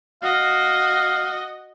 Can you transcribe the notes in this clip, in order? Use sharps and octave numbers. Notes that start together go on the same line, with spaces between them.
F#4 D#5 F5